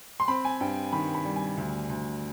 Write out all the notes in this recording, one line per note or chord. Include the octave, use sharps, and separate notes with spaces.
C6
C4 B5
G#5
G2 G5
D#3 B5
B5
G3
G#5
D2
D2